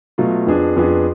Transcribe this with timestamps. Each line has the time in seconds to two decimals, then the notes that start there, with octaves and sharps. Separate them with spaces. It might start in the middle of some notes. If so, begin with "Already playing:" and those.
0.18 B2 F#3 A3 F4
0.47 F2 F3 B3 D4 G#4
0.76 F2 F3 B3 D4 G#4